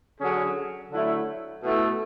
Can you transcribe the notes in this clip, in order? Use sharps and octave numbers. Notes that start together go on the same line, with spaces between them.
D3 F#3 C#4 G#4
D3 F#3 A3 E4
B2 A3 E4 A4